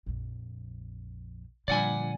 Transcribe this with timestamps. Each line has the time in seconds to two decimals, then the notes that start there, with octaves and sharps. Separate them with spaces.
0.06 A#1 F2
1.68 A#2 D3 F3 G3 D4 D5 F#5 G#5